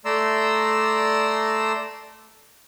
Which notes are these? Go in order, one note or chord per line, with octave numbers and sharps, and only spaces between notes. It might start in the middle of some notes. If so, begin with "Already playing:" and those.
A3 D5 A#5 C6 E6